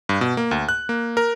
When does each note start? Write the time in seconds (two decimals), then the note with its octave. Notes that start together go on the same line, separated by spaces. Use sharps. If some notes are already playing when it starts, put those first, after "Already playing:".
0.09 G2
0.21 B2
0.37 A#3
0.51 D2
0.69 F#6
0.89 A#3
1.17 A#4